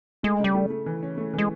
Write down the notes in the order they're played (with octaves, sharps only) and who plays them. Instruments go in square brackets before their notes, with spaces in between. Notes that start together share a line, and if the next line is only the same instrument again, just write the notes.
[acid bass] G#3 [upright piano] A3
[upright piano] C#3 [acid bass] G3
[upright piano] A3
A3
E3
C#4
A3
[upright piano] E3 [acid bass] G#3